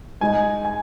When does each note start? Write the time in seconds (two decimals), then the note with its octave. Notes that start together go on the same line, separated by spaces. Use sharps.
0.21 G#2 G#3 D#4 G#5
0.65 G#5